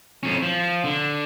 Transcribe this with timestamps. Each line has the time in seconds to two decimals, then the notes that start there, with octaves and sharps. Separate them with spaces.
0.23 F2 C#4
0.42 F3
0.84 D3